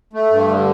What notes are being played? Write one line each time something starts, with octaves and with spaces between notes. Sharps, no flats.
A3
G2
D3